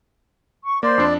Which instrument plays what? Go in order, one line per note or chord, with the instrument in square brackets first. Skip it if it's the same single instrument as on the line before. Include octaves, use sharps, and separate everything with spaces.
[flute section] C#6
[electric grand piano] A#3 [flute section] C5 [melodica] D5
[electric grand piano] F2 D4